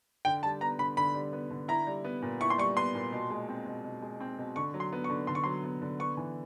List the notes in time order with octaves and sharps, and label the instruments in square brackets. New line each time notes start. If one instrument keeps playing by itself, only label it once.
[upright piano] D3 [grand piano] G5
[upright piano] G3 [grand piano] A5
[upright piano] B3 [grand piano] A#5
[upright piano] D3 [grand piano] B5
[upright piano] D3 [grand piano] B5
[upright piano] G3
B3
D3
[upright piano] E4 [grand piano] A#5
[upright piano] G3
B3
A#2
[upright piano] E4 [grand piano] C#6
[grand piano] C6
[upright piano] G3 [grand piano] C#6
[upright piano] B3 [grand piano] C6
[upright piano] A#2
B2
G#3
C4
B2
B2
G#3
C4
B2
[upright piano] D3 [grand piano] C#6
[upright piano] F#3
[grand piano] C6
[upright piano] B3
[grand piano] C#6
[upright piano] D3
[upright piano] D3 [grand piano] C6
[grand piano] C#6
[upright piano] F#3 [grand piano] C6
[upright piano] B3
D3
[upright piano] B3 [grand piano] C#6
[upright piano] E3